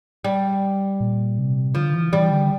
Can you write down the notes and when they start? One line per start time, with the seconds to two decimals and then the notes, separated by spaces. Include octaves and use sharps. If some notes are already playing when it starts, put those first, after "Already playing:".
0.25 G3
1.00 A#2
1.38 C3
1.75 D3 F3
1.94 E3
2.13 E3 G3
2.31 D3